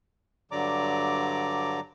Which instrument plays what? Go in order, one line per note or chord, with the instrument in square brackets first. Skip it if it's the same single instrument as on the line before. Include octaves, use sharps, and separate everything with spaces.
[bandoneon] G2 D3 F#3 D5 A#5 D6